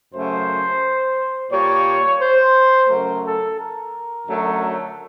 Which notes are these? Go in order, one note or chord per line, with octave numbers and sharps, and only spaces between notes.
F#2 C#3 F#3 A3 C5
A#2 G3 A#3 C#5
C5
F#2 C#3 F#3 A3 A#4
A4
A#4
F#2 D3 F#3 A3